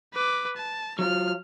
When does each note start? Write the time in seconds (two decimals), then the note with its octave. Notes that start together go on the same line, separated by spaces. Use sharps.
0.14 B4 D6
0.56 A5
0.99 F#3 F4 F6